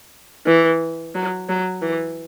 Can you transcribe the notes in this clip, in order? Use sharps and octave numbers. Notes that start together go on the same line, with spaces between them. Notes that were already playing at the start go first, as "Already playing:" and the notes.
E3
F#3
F#3
E3